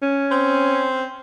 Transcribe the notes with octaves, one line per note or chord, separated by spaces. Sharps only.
C#4
C4